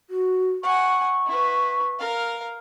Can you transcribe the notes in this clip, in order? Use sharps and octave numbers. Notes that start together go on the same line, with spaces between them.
F#4
F#5 G#5 C#6
E4 B4
A#4 F5